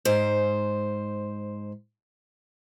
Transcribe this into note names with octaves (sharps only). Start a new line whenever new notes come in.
G#2 C5